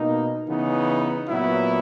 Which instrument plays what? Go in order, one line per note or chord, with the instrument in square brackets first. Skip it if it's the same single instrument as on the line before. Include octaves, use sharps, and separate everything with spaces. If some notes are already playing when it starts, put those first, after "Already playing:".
Already playing: [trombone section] B2 A#3 D#4
C#3 E3 B3 D#4
A#2 F#3 B3 E4